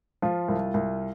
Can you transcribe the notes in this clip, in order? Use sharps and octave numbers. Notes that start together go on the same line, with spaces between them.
F3 F4
C2
C2